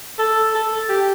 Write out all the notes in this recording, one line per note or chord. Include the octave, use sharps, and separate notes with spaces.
A4
A4
G4